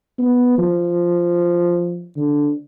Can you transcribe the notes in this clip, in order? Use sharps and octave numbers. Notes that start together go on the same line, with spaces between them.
B3
F3
D3